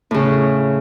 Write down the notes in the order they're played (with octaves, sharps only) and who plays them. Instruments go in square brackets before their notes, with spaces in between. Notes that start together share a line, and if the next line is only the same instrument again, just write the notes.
[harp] A2 C#3